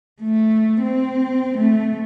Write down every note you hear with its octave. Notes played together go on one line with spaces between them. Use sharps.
A3
C4
A3